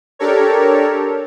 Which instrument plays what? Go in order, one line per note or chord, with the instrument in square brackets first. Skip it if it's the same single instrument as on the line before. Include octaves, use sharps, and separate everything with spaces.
[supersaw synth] D4 G4 A4 A#4 C#5